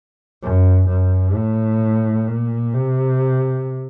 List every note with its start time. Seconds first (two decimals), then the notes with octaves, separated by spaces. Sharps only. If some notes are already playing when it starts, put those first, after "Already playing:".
0.43 F#2
0.89 F#2
1.35 A2
2.27 A#2
2.74 C3